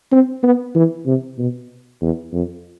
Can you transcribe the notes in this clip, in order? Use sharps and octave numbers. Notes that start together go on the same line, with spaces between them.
C4
B3
E3
C3
B2
E2
F2